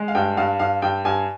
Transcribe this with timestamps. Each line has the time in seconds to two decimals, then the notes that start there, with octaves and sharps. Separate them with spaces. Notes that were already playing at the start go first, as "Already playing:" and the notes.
Already playing: G#3
0.08 F5
0.15 G2 G5
0.37 G2 F5
0.59 G2 F5
0.82 G2 G5
1.05 G2 G#5